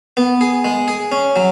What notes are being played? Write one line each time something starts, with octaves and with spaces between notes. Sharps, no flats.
B3
G#4
G#3
G#4
C#4
F#3